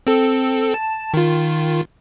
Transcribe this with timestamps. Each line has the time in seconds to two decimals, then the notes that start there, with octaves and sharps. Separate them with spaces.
0.07 C4 A4
0.74 A5
1.14 D#3 F4